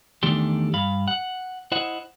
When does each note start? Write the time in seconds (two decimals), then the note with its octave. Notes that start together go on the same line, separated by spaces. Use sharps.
0.23 E2 D#3 A3 D4 G4 C6
0.73 G2 F5 B5
1.08 F#5
1.72 E4 C5 D#5 F#5